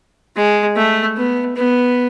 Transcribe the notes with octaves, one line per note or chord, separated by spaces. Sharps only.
G#3
A3
B3
B3